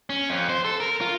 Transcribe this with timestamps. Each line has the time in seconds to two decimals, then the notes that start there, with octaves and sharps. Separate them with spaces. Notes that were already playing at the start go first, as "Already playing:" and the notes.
0.10 C#4
0.29 F2
0.49 C5
0.65 A4
0.80 A#4
1.01 F4